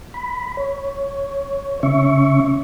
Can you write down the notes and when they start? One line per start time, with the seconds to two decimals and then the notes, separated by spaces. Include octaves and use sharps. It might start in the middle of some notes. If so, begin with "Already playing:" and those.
0.14 B5
0.57 C#5
1.83 C#3 C#4 E5 C#6